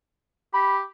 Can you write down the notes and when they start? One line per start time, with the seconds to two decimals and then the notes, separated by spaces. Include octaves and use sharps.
0.54 G4 B5